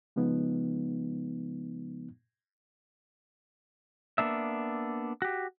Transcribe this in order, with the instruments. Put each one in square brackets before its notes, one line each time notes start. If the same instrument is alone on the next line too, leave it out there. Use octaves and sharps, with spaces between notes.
[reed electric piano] C#3 F3 G#3 B3 D#4
[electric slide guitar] A#3 B3 D4 E5
F#4 G4